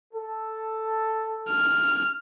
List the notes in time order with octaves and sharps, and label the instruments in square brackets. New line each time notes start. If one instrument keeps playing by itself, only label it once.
[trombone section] A4
[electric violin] F6